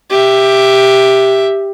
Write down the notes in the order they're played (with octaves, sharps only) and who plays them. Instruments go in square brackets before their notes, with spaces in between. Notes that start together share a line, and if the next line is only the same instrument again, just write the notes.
[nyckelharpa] G4 E5